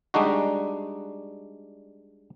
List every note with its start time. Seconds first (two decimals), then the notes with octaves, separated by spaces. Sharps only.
0.14 G3 G#3 D4 D#4 F#4